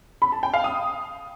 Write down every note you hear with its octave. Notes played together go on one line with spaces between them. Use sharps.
B5
A5
G5
F5
D#6